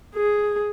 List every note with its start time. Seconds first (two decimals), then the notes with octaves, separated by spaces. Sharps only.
0.15 G#4